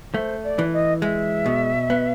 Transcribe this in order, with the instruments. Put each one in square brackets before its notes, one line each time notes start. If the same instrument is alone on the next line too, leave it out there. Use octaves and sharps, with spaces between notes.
[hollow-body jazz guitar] A3 [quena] C5
[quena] D5
[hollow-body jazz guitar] E3
[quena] D#5
[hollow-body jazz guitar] G#3 [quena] E5
[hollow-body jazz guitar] B2
B3